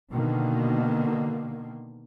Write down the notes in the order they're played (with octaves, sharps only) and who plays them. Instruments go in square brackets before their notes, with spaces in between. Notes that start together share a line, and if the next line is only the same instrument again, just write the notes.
[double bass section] B2 D3 D#3 A#3